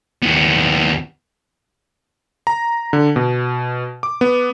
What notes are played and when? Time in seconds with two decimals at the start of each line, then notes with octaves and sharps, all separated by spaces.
0.23 D#2 B3
2.47 A#5
2.93 D3
3.16 B2
4.03 D6
4.21 B3